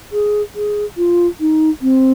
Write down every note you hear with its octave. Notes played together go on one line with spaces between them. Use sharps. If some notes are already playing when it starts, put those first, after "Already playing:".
G#4
G#4
F4
D#4
C4